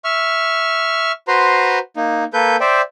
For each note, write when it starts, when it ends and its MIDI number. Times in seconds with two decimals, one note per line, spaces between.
0.05 1.12 76
0.05 1.12 85
0.05 1.12 89
1.28 1.79 66
1.28 1.79 71
1.28 1.79 72
1.28 1.79 82
1.28 1.79 84
1.97 2.24 58
1.97 2.24 63
2.34 2.57 58
2.34 2.57 69
2.34 2.57 71
2.34 2.57 91
2.60 2.81 72
2.60 2.81 74
2.60 2.81 76
2.60 2.81 79